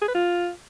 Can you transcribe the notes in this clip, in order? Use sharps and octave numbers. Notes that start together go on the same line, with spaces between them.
G#4
B4
F4